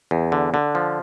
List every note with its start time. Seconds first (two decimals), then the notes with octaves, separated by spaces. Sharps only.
0.11 E2
0.32 D3
0.54 D3
0.75 F3